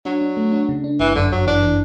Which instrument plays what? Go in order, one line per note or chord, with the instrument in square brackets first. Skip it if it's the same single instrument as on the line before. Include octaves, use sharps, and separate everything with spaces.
[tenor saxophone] F#3 [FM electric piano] D4
[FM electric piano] D4
A3
D4
C#3
D4
[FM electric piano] G1 [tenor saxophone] E3
[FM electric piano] F#2 [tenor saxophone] D3
[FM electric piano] G1 [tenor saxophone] F#3
[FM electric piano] E3 [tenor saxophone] D4
[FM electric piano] E3